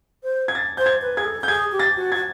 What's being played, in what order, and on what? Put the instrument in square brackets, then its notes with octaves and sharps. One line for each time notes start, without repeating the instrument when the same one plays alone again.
[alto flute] C5
[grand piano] G#6
A6
[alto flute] C5 [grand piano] G6
[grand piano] G#6
[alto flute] B4
[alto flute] G#4 [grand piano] G#6
[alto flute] A4
[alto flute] A4 [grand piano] G6
[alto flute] G#4 [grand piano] G#6
[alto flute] G4
[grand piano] A6
[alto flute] F#4
[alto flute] F#4 [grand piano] G#6